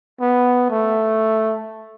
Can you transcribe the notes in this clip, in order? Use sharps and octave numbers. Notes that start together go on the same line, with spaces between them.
B3
A3